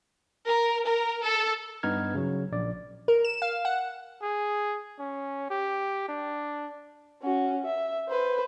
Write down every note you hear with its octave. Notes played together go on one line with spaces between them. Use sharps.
A#4
A#4
A4
G2 B3 D#4 F6 G#6
C#3 F#3
A#1 D5
A#4
E7
F5
F#5
G#4
C#4
G4
D4
C#4 F#4
E5
B4 C5